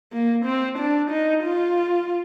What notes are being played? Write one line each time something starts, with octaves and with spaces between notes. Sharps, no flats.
A#3
C4
D4
D#4
F4